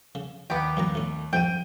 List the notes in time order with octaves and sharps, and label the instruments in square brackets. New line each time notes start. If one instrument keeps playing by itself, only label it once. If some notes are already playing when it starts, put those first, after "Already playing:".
[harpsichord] C#3
[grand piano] D#2 [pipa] B3 G4
[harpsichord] G2 A#2 A#5
A2 C#4
[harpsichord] F2 G#2 [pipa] G5 [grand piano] G6 D#7